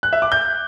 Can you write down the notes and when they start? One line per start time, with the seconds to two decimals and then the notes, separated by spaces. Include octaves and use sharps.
0.03 F#6
0.13 E5
0.22 D6
0.32 G6